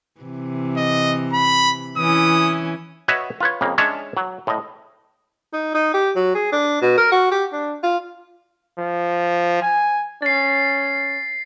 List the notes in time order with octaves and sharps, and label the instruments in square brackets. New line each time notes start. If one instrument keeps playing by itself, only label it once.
[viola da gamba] C3 E3
[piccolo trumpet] D#5
B5
[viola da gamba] E3 C#4 E4 [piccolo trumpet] D#6
[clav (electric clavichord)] F#4 B4 C#5 D#5 E5 F#5
F4 B4 C#5
F2 C#3 A#3
G#3 C#4 D4 C#5 E5
F#3
A2 D#5
[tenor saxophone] D#4
D#4
G4
F#3
G#4
D4
B2
A#4
F#4
G4
D4
F4
[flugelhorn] F3
G#5
[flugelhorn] C#4 [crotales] A6 C7